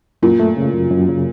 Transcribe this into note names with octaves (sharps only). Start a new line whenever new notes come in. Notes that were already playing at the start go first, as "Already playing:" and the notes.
F#2 A#2
A3
C#3
F#2
F#2
C#3